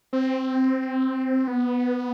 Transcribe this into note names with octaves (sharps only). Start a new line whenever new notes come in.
C4
B3